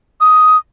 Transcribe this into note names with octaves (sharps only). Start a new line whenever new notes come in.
D#6